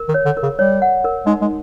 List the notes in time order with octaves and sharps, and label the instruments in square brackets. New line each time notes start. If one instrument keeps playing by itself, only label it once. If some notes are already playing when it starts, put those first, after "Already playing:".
Already playing: [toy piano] A#4
[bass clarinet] D#3
[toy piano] C#5
[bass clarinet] D3
[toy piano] A#4
[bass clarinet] C#3
[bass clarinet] G3 [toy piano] C#5
[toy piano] F#5
A#4
[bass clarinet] G#3 [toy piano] D#4
[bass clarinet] G#3